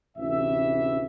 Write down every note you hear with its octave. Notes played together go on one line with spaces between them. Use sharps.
A1 D2 C3 E3 E5